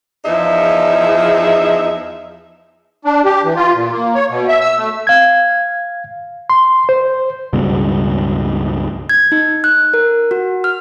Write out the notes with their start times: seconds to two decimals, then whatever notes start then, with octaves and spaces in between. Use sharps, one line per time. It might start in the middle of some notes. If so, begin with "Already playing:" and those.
0.25 E2 F3 D#4 G#4 E5
3.05 D4
3.25 G4
3.44 E3
3.56 F4
3.74 A#2
3.92 A#3
4.15 C#5
4.29 B2
4.48 E5
4.61 E6
4.77 A3
5.07 F5 G#6
6.50 C6
6.89 C5
7.53 C#2 G2 B2
9.09 G#6
9.32 D#4
9.64 F#6
9.94 A#4
10.31 F#4
10.64 F6